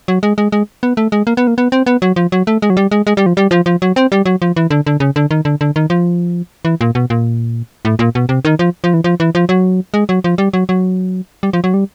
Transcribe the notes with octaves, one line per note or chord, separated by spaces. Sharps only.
F#3
G#3
G#3
G#3
B3
A3
G#3
A#3
B3
A#3
B3
C4
B3
F#3
F3
F#3
A3
G#3
F#3
G3
G#3
G#3
G3
F3
G3
F3
F3
F#3
C4
G3
F#3
F3
E3
D3
D3
C#3
D3
D#3
D3
D3
D#3
F3
E3
A#2
B2
A#2
A2
A#2
B2
C3
D#3
F3
F3
E3
F3
E3
F3
F#3
G#3
F#3
F3
G3
F#3
F#3
G3
F3
F#3
G3